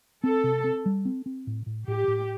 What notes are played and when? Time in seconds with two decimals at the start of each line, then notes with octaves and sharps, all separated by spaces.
0.23 C4 A4
0.44 C3
0.64 C4
0.86 G3
1.05 C4
1.26 C4
1.47 A2
1.66 A2
1.87 A2 G4
2.08 A2